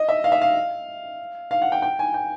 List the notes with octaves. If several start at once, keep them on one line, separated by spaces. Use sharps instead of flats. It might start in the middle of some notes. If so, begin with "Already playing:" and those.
Already playing: D#5
E5
F5
E5
F5
F5
F#5
G5
G5
G#5
G5